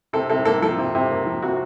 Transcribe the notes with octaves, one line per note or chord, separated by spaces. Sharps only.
C3 A4
C3 A4
A#3 A4
F3 A4
C3
C3
A#3
F3
C3 F#4